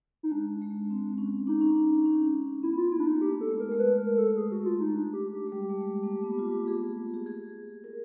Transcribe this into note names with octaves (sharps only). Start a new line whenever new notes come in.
D#4
G#3 D4
G#3
C4
C#4
D4 D#4
C#4
D4
C#4
B3 E4
F4
A#3 E4
D4
D#4
A3 G4
A4
G#3
A#4
G#3
A3 B4
A#4
A4
G#4
F#4
F4
D#4
D4
G4
G4
G#3
G3 G4
A3
G#3
A#3
A3
B3
F4
F4
G#4
G4
G#4
A#4